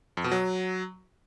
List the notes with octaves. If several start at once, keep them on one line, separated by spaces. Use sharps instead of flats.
F2
B2
F#3